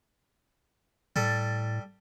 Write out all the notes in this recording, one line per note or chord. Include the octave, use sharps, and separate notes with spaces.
A2 G3 A4